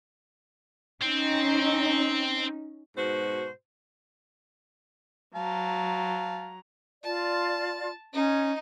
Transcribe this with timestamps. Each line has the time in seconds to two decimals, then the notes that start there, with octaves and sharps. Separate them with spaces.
1.02 C4 C#4 D#4
2.97 G#2 B2 F#4 C5
5.35 F#3 F5 A5 A#5
7.04 F4 D5 A5
8.13 C#4 D#4